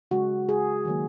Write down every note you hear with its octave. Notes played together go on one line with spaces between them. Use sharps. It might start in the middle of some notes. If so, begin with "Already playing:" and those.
C#3 G#3 F#4
G#4
D#3 F#3 A#3